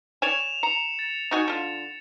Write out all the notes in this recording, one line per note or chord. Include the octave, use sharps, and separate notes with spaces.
C#5 D5 G#5 E7 F7
A#5 C#7
A6
D#4 F#4 G#5
D3 F4